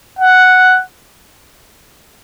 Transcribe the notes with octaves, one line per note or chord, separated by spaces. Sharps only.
F#5